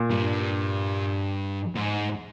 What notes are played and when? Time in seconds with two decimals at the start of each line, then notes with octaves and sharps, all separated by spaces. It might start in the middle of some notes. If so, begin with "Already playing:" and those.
Already playing: A#2
0.10 G2
1.75 G#2